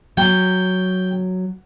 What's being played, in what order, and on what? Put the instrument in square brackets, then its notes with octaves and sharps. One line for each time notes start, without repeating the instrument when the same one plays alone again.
[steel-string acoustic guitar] F#3 [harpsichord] G5